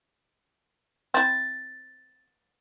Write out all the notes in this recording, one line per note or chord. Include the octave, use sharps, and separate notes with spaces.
C4 E4 A6